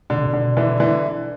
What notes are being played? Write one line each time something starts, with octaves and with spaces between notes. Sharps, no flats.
B2 D3
C3
B2
D3
D3 E3
D3 E3